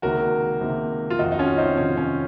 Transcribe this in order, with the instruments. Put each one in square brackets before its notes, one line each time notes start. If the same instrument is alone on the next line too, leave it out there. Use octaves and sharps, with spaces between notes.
[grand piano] C#2 C3 D#3 A#3 F#4 A#4
C#2 C3 D#3 A#3
F4
F1 F2 D#3 D#4 F#4
D#4
C#4 F4
C4 D#4
F1 F2 D#3 C#4
C#4